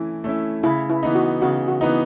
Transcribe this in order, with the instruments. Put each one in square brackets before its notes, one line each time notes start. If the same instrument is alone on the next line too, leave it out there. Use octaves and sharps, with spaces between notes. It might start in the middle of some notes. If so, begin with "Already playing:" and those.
Already playing: [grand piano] E3 A3 C#4 E4
A3 C#4 E4
[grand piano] C#3 [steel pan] E4
[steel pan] E4
[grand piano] E3 B3 D#4
[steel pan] F#4
[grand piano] C#3 [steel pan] F#4
[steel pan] F#4
[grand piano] E3 B3 D#4